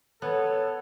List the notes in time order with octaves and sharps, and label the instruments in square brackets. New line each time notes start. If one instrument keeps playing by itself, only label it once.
[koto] B3 [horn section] A4 [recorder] C#5